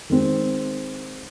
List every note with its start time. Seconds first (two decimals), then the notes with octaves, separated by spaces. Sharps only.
0.10 D#3 G#3 C4